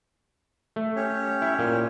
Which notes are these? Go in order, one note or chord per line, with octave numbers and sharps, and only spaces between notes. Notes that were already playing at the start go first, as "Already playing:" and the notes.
A3
C#4 G4 C#5
E4
A#2